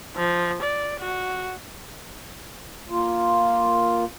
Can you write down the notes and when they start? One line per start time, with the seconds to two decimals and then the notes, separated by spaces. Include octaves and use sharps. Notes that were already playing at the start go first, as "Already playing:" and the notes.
0.16 F3
0.63 D5
1.00 F#4
2.90 A#3 F4